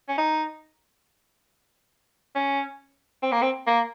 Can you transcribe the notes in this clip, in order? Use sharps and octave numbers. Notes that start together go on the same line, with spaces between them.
C#4
D#4
C#4
C4
A#3
C4
A#3